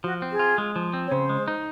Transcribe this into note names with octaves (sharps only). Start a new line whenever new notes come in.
F3 F#4
C4
G#4
F4
G#3
F3
C4
C#5
C#3 C5
G#3
D#4